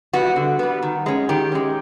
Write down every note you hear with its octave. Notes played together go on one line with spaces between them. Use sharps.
G3 B3 F#4
D3
G3 B3
D#3
G#3 C#4
D#3 G4
G#3 C#4